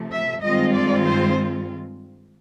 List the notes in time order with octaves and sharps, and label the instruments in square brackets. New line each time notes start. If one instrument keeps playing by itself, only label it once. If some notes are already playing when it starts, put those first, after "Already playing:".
Already playing: [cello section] C3 F3 A3
E5
G2 D#3 G#3 C4 F4 D#5
D5
C5